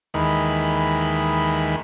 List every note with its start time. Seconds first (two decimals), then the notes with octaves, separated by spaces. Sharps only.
0.14 D#2 D#3 E3 G#3 B5